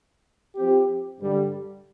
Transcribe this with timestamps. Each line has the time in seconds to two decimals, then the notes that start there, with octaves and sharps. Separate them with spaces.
0.55 F3 C4 G4
1.19 G2 D3 G3